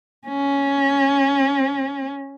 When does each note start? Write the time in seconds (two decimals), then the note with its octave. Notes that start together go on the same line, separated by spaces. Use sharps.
0.28 C#4